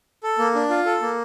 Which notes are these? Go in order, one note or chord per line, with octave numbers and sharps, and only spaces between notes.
A4
A#3
D4
F4
A4
A#3